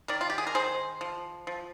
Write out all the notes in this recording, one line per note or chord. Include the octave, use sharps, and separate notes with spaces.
D#3 A#4 D5
F4
G4
G#4
A#4
D#3 G#4 C5
F3
F3